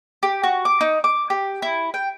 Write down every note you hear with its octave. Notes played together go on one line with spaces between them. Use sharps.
G4
F#4
D6
D#4
D6
G4
E4
G5